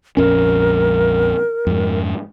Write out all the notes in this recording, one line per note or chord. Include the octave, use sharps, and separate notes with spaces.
A#1 F2 C#4 A#4
F2 G#2